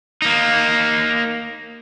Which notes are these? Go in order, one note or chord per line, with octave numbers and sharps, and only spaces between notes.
A#3 D#4